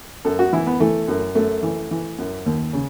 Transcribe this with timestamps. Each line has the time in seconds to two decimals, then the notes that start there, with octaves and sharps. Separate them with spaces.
0.25 F#2 A4
0.39 F#4
0.53 E3 E4
0.67 B3
0.80 E3 A3
1.08 F#2
1.35 F#2 A3
1.63 E3
1.91 E3
2.18 F#2
2.46 D#2
2.73 C#3